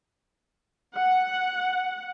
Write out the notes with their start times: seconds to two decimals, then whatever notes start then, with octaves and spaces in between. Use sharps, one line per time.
0.95 F#5